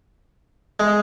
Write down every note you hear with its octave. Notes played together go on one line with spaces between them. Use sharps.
G#3